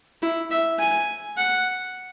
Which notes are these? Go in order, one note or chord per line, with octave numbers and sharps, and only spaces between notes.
E4
E5
G#5
F#5